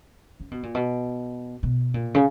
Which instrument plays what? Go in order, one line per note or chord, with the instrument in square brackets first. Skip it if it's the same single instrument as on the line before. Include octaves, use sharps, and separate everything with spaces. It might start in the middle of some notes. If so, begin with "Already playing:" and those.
[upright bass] C#3
B2
A#2
B2
B2
A#2
C#3